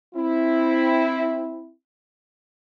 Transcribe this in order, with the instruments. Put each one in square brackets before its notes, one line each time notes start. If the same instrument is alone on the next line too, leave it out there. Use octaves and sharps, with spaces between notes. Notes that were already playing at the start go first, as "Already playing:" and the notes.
[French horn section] C4 E4